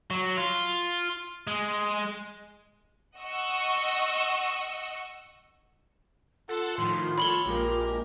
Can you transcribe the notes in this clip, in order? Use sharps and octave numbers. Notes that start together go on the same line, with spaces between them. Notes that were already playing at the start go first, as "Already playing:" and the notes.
F#3
F4
G#3
D#5 F#5 C#6 E6
F4 A4 F#5 A5 C6
A2 D#3 F3 C6
A4 C#5 B5 F#7 G7
A#1 G#3 A#3 G4 A#4